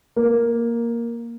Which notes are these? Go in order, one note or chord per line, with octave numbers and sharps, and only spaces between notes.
A#3